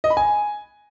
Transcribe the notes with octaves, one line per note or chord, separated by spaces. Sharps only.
D#5
B5
G#5